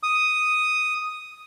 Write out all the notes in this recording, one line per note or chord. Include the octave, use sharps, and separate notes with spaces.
D#6